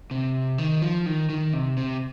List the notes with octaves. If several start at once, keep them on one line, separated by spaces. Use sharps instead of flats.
C3
D#3
F3
D#3
D#3
C3
C3